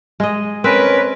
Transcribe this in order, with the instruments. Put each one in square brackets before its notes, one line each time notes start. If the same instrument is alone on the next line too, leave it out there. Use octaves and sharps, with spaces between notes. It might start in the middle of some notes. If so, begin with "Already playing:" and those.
[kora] G#3 D#5
[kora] C4 [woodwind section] C#4 A#4 B4